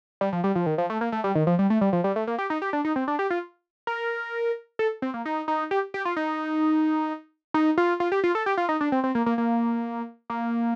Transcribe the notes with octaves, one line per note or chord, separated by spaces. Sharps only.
G3
F3
G3
F3
D#3
F3
A3
A#3
A3
G3
D#3
F3
G3
A3
G3
F3
G3
A3
A#3
G4
D#4
G4
D4
D#4
C4
D4
G4
F4
A#4
A4
C4
A#3
D#4
D#4
G4
G4
F4
D#4
D#4
F4
F4
G4
F4
A4
G4
F4
D#4
D4
C4
C4
A#3
A#3
A#3
A#3